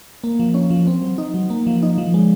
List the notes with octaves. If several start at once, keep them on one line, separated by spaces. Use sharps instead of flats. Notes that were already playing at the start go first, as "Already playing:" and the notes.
A#3
F3
C#4
F3
C4
F#3
D#4
F#3
A#3
F3
D#4
F3
G#3